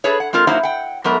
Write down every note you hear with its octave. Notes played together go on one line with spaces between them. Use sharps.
G#4 A4 B4 C#5
F#5
G#3 C4 F4 A#4
F#3 A#3 D#4 E4 C5 F#5
F#5 G5
G#2 F#3 A3 B3 A#4